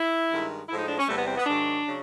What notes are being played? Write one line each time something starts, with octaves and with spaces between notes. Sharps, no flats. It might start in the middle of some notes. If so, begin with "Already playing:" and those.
Already playing: E4
G2 D#3 G#3
A2 F3 G#3 E4
D#4
D4
C#4
E2 C3 E3 G3 A3
B3
C4
B3
G#2 D#3 F#3 D4
C#3 F#3